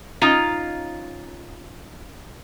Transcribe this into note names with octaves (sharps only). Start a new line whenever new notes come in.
C#4 D#4 F4 D#5 F5 A#5